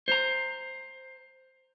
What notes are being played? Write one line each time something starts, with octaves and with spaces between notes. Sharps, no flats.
C5 A#5